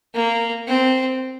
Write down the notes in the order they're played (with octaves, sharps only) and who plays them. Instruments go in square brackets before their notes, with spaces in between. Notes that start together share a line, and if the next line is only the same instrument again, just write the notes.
[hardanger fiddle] A#3
C4